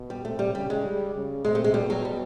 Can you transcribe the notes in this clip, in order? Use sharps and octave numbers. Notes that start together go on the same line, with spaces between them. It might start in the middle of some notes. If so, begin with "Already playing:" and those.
Already playing: B2
G3
C3 A3
G3
C#3 G3
G#3
G3
C#3
C3 G#3
A3
G#3
B2 G3
F#3
G3